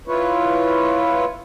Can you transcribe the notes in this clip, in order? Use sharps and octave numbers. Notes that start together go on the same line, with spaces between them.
E4 F4 B4 C#5